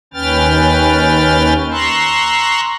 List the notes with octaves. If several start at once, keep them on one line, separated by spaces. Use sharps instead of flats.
D#2 C#4 B4 G5 F6 A6
A#5 C6 C#6 E6 F#6